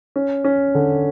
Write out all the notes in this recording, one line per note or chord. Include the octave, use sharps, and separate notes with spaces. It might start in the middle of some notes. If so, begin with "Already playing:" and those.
C#4
C#4
D3